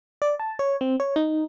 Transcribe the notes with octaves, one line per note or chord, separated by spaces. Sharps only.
D5
A5
C#5
C4
C#5
D#4